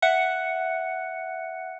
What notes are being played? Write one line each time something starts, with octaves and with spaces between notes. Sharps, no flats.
E5 F#5 F#6 C#7